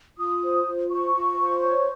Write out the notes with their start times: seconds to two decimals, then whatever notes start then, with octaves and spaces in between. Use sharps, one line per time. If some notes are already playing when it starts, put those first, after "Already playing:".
0.17 F4 D#6
0.42 C5
0.67 F4
0.90 C5 C#6
1.15 F4
1.39 C5
1.63 C#5